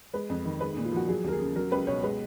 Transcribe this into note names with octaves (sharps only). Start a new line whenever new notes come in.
G#3 B4
F2
D#3
G#3 B4
D#4
A#2
F4
F3 F#4
F#3 G#4
D#2 A#4
G#4
C#3
F#3 A#4
C#2 B4
B2 C#5
G#3 B4